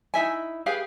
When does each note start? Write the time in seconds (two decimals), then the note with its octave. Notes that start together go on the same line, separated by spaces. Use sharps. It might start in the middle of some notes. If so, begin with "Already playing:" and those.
0.14 D#4 E4 E5 G#5
0.66 G4 G#4 B4 F5